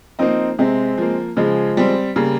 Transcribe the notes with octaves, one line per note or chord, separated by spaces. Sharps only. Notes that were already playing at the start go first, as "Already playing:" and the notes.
F3 A#3 C4 D#4
C3 G#3 C4
F3 A#3
C#3 F3 G#3
G3 C4
C#3 G3 A#3